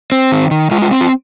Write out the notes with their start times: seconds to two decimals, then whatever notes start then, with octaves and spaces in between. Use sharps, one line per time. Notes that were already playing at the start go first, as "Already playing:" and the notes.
0.12 C4
0.32 D#3
0.51 D#3
0.71 G#3 F4
0.82 F4
0.91 C4
1.01 F4